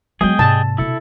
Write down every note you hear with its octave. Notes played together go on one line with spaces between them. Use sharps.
F#3 G#3 B3 G#4 D#5 G5
G#2 C3 A5
B2 D3 E4 A4